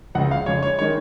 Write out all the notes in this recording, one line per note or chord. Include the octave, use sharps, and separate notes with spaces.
C#2 C#3 G#3 F#5
F5
F2 C#3 G#3 C#5
C#5
D#3 G#3 C#5